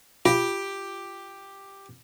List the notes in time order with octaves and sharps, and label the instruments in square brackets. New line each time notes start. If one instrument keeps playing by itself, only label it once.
[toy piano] F4 [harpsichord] G4